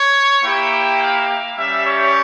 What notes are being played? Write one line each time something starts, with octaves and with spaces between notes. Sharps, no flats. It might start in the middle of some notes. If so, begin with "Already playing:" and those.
Already playing: C#5
A#3 E4 G4 G5
F5
G3 C#4 G4 E5
C#5